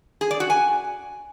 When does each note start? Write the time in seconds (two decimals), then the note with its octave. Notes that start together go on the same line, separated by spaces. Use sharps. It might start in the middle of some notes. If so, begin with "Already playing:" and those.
0.21 G#4
0.31 D5
0.40 F#4
0.50 G#5